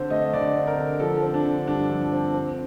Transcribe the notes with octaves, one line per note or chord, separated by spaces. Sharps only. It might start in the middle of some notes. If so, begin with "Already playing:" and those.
Already playing: D3 C4 C5
A3 D#5
D3 D5
C4
A#4
D3
F3 A4
C4
D4
D3
G2 D4
F3
C4
C4